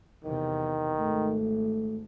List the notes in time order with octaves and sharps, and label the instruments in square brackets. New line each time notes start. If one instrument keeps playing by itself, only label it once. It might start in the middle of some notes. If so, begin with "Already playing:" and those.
[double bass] E2 C3 [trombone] D#3
[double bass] G#1 [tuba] A3